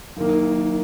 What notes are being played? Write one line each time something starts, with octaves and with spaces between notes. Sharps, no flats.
F#1 D#3 A#3